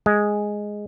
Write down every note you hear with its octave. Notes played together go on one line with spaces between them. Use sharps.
G#3